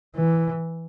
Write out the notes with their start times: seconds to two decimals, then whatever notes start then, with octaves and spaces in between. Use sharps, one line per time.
0.16 E3